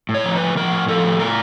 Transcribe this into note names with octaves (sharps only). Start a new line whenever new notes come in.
A2
C#5
F3
B4
A2
F3 A#4
A2
F3 A4
A2
A#4